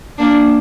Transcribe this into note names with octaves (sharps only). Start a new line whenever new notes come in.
A#3 D4